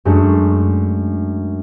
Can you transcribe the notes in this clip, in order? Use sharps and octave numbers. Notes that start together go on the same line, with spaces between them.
F#2 G#3 A3 D4